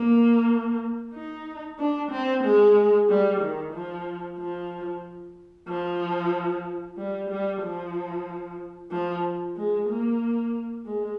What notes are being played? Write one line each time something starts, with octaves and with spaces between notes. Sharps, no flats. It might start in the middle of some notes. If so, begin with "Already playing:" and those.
Already playing: A#3
D#4
D4
C4
G#3
G3
D#3
F3
F3
F3
G3
G3
F3
F3
G#3
A#3
G#3